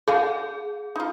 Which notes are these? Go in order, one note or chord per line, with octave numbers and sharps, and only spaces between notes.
G#4 D5 F5 G#5
D#4 F4